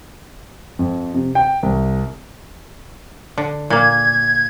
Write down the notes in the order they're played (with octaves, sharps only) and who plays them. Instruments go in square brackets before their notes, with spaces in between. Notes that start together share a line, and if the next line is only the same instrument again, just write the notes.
[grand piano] F2
C3
G5
C2
[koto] D3
[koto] A#2 A#3 [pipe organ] G#6